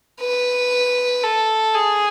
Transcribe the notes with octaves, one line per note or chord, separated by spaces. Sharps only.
B4
A4
G#4